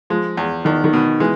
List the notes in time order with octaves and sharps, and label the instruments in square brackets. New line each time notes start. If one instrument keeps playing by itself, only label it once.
[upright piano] F3 [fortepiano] G#3
[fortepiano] E2
[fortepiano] E2 [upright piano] D#3
[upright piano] D#3
[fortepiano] B2
[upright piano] E3 [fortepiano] G#3